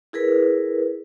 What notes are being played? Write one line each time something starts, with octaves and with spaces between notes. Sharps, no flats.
E4 G#4 A#4 B4